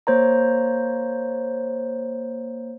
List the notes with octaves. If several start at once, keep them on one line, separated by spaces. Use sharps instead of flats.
A#3 C5 C#5 A#5